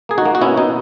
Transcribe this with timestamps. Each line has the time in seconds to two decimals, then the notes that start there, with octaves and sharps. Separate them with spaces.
0.09 A#3 G#4
0.18 D#4 F#4
0.26 A#3
0.35 F#4
0.41 B2 C#4 E4
0.57 B2 D#4